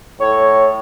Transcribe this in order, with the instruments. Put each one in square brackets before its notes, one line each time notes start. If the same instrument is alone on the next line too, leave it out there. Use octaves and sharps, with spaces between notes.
[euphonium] A2 [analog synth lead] C#5